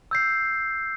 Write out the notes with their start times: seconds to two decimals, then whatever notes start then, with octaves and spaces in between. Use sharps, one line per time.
0.11 E6 G6 C7